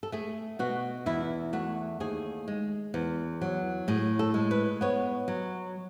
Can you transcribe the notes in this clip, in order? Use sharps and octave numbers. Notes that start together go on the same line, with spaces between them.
A4
A3 G#4
B2 F#4
E2 E4
A3 F#4
D#2 G#4
G#3
E2
F#3
A2 G#4
A4
G#3
B4
B3 C#5
F#3